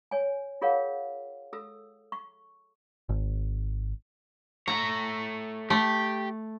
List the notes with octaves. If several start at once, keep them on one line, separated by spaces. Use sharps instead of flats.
C#5 G#5
F4 G#4 A#4 C#5 F5 F#5
A4 E6
C#6
G#1
A3 C#5 A#5
A3 G4